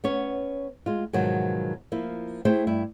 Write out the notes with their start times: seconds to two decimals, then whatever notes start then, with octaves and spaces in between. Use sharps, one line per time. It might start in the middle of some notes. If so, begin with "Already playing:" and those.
0.04 B3 C#4 C#5
0.86 G#3 F4
1.13 G#2 B2 D#3 F3 F#3
1.92 F3 A#3 E4
2.45 A3 E4 G#4 C5 E5 G5
2.67 G2 E4